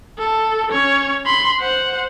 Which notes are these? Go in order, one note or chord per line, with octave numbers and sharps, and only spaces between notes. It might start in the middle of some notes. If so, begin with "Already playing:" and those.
A4
C#4 C#5
B5 C6
C5 F#5